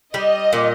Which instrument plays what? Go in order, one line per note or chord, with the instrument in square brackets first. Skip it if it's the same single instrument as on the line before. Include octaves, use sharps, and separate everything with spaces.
[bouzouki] G3 [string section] D#5
[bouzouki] A#2